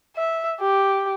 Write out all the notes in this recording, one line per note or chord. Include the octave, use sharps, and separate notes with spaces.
E5
G4